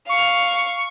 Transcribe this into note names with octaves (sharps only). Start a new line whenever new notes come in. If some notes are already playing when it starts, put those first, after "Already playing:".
F5 C#6